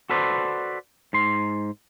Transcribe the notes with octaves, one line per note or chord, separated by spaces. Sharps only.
F#4 A4 B4 C5 D5
G#2 C6